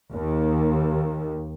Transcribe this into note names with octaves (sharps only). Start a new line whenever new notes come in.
D#2